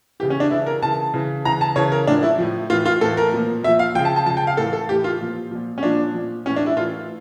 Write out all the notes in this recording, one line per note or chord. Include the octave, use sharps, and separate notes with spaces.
C#3 E3 G4
C#4
D4
C#3 E3 E4
A#4
C#3 E3 A5
C#3 E3
C#3 E3 A#5
A5
C#3 E3 C#5
A#4
A2 F3 D4
E4
A2 F3
A2 E3 F4
F4
A2 E3 A4
A#4
A#2 F3
A#2 F3 E5
F5
C#3 F3 G5
A5
A5
C#3 F3 A5
G5
F5
A2 E3 A4
A4
A2 E3 G4
F4
A#2 F3
A#2 F3
C#4
A#2 F3 D4
A#2 F3
A2 E3 C#4
D4
E4
A2 E3 F4